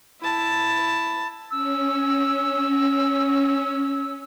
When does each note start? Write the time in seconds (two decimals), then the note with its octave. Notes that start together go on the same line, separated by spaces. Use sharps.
0.21 E4 A5
1.51 C#4 E6